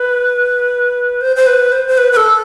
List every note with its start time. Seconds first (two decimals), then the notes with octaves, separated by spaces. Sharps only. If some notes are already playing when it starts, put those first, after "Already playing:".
Already playing: B4
1.21 C5
1.36 C5
1.47 B4
1.72 C5
1.88 C5
1.98 B4
2.12 B4
2.17 A4